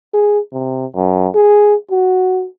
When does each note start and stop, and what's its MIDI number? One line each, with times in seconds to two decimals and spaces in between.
0.14 0.39 68
0.53 0.86 48
0.95 1.28 42
1.35 1.75 68
1.91 2.46 66